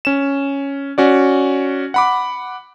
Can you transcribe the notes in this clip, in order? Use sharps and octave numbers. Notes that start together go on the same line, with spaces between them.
C#4 E7
C#4 F#4 D5
F#5 B5 D6